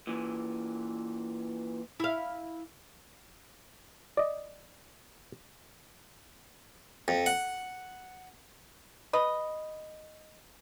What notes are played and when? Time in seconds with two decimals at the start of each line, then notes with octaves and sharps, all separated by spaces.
0.07 A#2 E3
2.00 E4 F5
4.17 D5 D#5
7.08 F2
7.26 F#5
9.13 B4 D#5